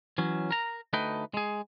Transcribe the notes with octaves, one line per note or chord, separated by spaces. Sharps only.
E3 F#3 C#4
A#4 A#5
D2 A3 D#4 B4 D#5 G5
G#3 G#4